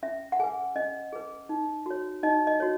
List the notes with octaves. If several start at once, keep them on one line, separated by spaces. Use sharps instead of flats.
C#4 E5
F#5
G#4 B4 G#5
C#4 D#5
G#4 B4
D#4
F#4 C#5
D#4 D#5
D#5
F#4 C#5